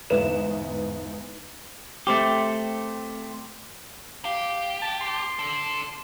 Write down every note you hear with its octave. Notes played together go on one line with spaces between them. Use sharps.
G1 E2 G#2 B3 E7
A3 C4 G4
G4 F5
A5
C6
D4 A4